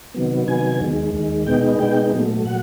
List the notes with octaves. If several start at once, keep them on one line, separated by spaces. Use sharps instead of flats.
C3 D#3 F#3 B3
C3 D#3 F#3 B3 G#5
D#2 D#3 G#3
D#2 D#3 G#3
B2 G#3 B3 D#4 G5
B2 G#3 B3 D#4 G5
A#2 F#3 A3
A#2 F#3 F#5